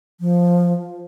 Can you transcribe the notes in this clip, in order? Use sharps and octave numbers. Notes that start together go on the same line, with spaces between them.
F3